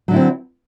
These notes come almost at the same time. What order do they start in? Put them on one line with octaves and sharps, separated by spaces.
F#3 D3 E4 C4